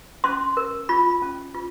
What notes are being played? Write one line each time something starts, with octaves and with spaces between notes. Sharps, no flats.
C#4 C6
A#4
F4 B5
C#4
F4